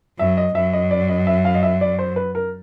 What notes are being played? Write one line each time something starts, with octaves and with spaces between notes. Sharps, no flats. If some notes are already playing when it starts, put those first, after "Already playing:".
F#2 E5
D#5
F#2 E5
D#5
D5
D#5
E5
F5
D#5
E5
D5
C5
B4
A#4